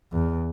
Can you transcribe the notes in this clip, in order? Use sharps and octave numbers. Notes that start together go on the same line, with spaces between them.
E2